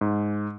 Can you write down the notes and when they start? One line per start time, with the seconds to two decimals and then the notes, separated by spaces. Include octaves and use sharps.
0.01 G#2